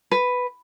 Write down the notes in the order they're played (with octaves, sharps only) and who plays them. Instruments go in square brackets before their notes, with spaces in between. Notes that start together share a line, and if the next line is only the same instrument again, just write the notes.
[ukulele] B4